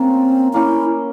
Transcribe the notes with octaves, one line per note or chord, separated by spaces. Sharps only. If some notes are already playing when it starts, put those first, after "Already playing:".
Already playing: A#3 C4 C#4 F4
A#3 C#4 E4